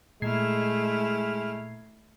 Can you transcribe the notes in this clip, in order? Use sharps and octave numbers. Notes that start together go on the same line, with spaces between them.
A#2 G#3 A3 E4 F6 G#6 C7